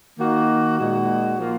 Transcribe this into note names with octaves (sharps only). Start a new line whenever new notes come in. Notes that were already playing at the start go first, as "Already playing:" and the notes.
D#3 A#3 D#4 F#4
A#2 G#3 D#4 F#4
F3 A#3 F4